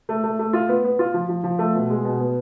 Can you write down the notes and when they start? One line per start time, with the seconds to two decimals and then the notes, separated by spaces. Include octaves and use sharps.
0.09 A3
0.24 A3
0.39 A3
0.53 F4
0.69 B3
0.84 B3
0.99 F4
1.14 F3
1.29 F3
1.44 F3
1.59 A3
1.75 B2
1.90 G#3
2.05 B2
2.20 B3